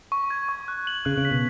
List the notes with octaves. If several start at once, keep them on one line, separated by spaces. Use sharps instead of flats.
C#6
G#6
C#6
F#6
F#7
C#3 F#6
C#3
B6
B2